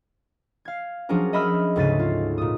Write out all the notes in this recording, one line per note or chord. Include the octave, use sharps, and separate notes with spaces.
F5 G#6
F3 F#3 C#4 D4 G#4 A#4
D#5 E5 B5 E6 F6
D2 G#2 C#3 A6 B6 D#7
F4
A#2 D#6